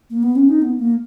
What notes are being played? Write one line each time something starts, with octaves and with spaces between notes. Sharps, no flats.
A#3
B3
C#4
D#4
B3
A#3